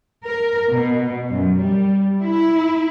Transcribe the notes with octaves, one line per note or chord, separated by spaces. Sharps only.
A#4
B2
F#2
G3
E4